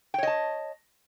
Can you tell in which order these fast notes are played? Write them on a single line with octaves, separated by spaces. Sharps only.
G5 C#5 D#5 A5